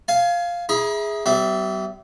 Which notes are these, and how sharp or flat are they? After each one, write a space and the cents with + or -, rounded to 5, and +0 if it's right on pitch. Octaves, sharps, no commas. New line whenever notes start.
F5 +0 G#5 +30
E4 -10 G#4 +0 A#5 +40
G3 -35 B3 +40 E5 +0